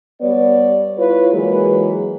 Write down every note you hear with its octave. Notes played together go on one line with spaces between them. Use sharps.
G3 B3 C#5 D5
E4 F4 B4 C#5
E3 F#3 G#3 A#3 G#4 B4